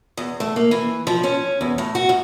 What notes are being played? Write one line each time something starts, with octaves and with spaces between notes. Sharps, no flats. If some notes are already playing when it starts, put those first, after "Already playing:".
E2
A3
A#3
E3
F3
C#4
E2
A2
F#4
F#2